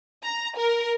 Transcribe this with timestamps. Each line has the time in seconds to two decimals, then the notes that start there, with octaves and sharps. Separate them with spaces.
0.24 A#5
0.58 A#4